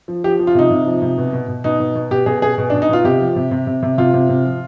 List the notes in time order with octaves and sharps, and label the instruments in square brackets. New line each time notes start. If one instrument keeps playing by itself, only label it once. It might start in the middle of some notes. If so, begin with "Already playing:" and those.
[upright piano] F3
F3 G4
F3
F4
C3 D#4
C3
F3
C3
B2
B2
B2
B2 D#4
B2
B2
B2 G4
B2 G#4
B2 G#4
B2
D4
B2
D#4
B2 F4
C3 G4
F3
C3
C3
C3
C3
C3 F4
C3
C3
F3